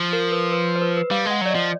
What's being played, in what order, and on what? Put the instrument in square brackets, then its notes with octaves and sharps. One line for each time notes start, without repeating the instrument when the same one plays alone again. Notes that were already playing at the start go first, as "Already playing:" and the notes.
Already playing: [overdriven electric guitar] F3
[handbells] A#4
B4
B4
C5
B4
B4
[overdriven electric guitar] G3 [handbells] F5
[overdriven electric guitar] G#3
[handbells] F#5
[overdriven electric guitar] F#3 [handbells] D5
[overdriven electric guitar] F3 [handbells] D#5